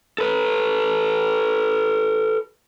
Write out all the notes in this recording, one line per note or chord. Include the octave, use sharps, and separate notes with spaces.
A4 B4